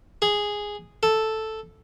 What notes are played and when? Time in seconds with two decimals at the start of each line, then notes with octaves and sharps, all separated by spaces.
0.22 G#4
1.03 A4